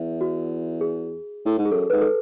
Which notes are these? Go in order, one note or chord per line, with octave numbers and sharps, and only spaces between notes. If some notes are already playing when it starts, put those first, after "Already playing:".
Already playing: E2 E5
F#4
G#4
A2
G#2
G#4
F#2 A4
G#2 B4
A4